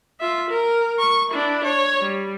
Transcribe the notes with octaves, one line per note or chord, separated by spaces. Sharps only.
F4 E5
A#4
C#6
D4 E4
C#5
G3